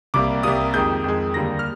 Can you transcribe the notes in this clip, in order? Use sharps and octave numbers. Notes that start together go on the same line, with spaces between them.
C2 C3 G3 A#3 D6
C2 C3 G3 A#3 D#6
F2 D#3 G#3 G6
F2 D#3 G#3
D#2 D3 G3 A#3 A#6
F6